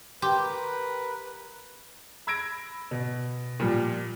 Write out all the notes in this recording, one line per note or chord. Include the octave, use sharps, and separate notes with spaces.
G4 A#4 B4 G5 C6
B5 E6 G#6 A#6 D7
B2
A#2 F3 G3